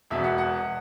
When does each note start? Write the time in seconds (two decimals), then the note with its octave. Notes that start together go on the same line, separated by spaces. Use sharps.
0.10 E1 E2 B2 E5
0.24 F#5
0.38 F#5